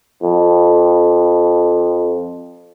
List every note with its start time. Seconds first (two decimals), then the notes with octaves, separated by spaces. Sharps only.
0.23 F2